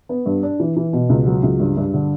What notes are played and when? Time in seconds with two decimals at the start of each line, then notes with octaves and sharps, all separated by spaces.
0.09 B3
0.26 G2
0.43 D4
0.60 E3
0.77 E3
0.93 B2
1.10 C#2
1.26 F#3
1.43 C#2
1.60 G2
1.77 G2
1.94 D3